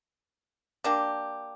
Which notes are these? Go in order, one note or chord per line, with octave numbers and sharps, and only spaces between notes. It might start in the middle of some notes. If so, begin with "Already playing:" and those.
A#3 D4 G4